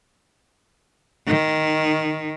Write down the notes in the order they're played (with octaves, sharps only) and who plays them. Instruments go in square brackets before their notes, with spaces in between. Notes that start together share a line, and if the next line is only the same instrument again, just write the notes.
[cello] D#3